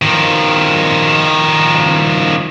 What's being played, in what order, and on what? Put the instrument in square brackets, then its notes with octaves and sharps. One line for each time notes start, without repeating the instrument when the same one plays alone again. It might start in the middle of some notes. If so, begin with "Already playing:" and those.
[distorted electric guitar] D#3 F3